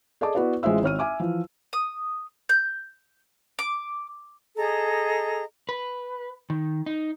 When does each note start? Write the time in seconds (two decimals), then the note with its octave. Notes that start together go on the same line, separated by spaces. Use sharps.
0.21 G#4 A4 D5 D#5 A5 D6
0.35 B3 E4 F#4 B4 D5
0.63 A1 G#3 F4 C5 E5 E6
0.82 G#1 C#5 F6 D#7
0.99 E5 G#5 D6 F6
1.20 E3 F3
1.73 D#6
2.49 G6
3.59 D6
4.56 G#4 A4 D#5 A#5
5.69 B4
6.50 D#3
6.86 D#4